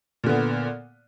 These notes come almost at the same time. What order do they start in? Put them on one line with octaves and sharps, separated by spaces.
A#2 D3 B3